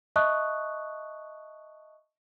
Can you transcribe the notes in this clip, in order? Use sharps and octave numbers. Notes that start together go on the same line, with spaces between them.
D#5 E5 A5 C#6 D#6 F#6